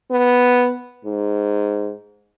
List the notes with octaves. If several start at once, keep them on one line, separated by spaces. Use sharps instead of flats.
B3
G#2